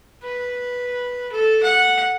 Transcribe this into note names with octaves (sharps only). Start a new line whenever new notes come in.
B4
A4
F#5